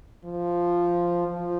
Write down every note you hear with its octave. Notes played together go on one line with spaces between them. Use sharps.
F3
F3